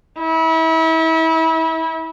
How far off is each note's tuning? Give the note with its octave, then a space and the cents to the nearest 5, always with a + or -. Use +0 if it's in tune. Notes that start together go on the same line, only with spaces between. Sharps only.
E4 -30